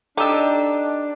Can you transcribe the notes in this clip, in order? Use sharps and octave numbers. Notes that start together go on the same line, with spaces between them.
D4 D#4 G4 A4 D#5 E6